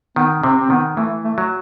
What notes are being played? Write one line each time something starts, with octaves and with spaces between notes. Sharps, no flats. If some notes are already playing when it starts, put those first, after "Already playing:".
D#3 B3
C3 C4
C4
D#3 B3
E3 A3
A3
F#3